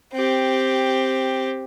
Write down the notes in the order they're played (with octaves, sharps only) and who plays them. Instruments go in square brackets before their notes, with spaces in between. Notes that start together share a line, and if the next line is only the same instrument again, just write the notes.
[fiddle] C4 G4